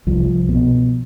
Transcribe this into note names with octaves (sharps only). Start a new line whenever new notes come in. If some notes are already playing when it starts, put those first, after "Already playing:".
C2 F3
B2